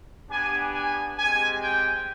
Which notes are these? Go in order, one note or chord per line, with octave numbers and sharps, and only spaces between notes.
B3 D4 G4 G#5
G#5
G#3 C4 G4 G#5
G5